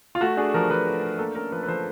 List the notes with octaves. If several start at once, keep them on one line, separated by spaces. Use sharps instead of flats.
F4
A3 F#4
D4 G#4
F3 A#4
F3 B4
A3
D4
A#3 A4
C#4 A#4
F3 B4
B4
F3 C5